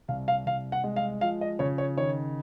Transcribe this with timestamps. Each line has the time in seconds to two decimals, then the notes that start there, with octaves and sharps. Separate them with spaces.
0.08 C2 F5
0.28 F5
0.46 C2 F5
0.72 F#5
0.84 G#3
0.96 F5
1.21 F3 F5
1.41 D#5
1.59 C#3 C#5
1.78 C#5
1.97 D#3 C#5